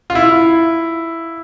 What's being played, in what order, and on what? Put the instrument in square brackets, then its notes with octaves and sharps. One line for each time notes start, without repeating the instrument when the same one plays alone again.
[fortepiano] F4
E4